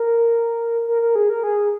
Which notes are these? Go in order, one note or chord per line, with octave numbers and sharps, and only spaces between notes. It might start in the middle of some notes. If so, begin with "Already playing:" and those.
Already playing: A#4
A#4
A#4
G#4
A#4
G#4